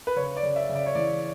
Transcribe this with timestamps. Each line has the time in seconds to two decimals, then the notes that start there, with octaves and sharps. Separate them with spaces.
0.07 B4
0.16 C#3 C#5
0.37 D5
0.43 C#3
0.56 E5
0.69 C#3
0.75 D5
0.86 C#5
0.95 E3 D5